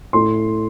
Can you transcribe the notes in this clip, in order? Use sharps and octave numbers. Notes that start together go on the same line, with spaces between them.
A2 C6